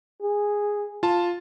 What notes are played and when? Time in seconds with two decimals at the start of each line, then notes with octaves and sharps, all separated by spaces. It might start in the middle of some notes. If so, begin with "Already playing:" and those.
0.22 G#4
1.03 F4 A5